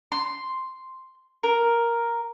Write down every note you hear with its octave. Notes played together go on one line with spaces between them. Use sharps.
C6
A#4